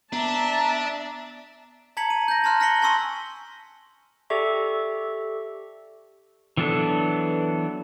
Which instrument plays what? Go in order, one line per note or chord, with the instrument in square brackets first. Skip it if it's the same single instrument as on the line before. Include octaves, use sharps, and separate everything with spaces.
[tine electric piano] B3 [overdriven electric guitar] D4 [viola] E5 A5 [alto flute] A#5
[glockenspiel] A5 A#5 G#6 B6 C#7 F#7
D#7
G6 A#6
A5 A#5 C6 F6 F#6
F6 A#6 B6 C#7 F#7 G7
G#5 A5 C6 C#6 E6
[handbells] G4 A4 D5 E5 C#6
[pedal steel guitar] E3 F#3 B3 D4 A4